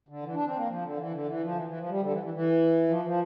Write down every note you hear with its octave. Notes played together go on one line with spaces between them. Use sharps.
D3
E3
D4
C4
A#3
F3
D3
E3
D3
E3
F3
D3
E3
E3
F3
G3
D3
E3
E3
E3
F3
F3